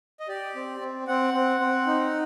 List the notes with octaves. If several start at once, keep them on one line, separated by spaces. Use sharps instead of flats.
D#5
G4 D5
C4
C4
C4 F#5
C4
C4
D#4